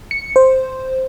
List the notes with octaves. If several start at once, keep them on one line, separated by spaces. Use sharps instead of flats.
C#7
C5